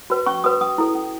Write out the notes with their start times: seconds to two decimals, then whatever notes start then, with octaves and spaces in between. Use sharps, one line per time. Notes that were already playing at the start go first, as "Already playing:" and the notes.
0.10 F#4 B4
0.26 C#4 C#6
0.44 F#4 B4 D#6
0.61 C#4 D#6
0.78 E4 A4
0.95 C#4